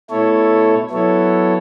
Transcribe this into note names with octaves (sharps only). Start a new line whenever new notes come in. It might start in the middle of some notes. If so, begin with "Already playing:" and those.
B2 A3 E4 A4 C#5
F#3 B3 E4 A4 C#5